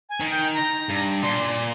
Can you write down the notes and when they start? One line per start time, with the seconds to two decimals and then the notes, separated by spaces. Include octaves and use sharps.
0.09 G#5
0.20 D#3
0.31 G5
0.54 A#5
0.89 G2
1.22 A#2 C6
1.58 C6